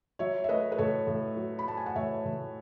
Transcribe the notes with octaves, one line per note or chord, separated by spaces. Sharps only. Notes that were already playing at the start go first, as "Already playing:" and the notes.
F#3 C#5 E5
E5
A3 B4 D#5
B4
A2 A4 C#5
A2
F#3
B5
A3 A5
G#5
F#5
A2 C#5 E5
A2